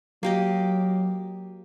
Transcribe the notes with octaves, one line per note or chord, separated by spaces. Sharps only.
F#3 A#3 G4 D#5